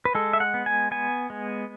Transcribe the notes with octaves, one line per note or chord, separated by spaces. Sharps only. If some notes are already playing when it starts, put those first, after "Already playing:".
B4
G#3 A4
E5
F#5
B3
G#5
B3 G#5
G#3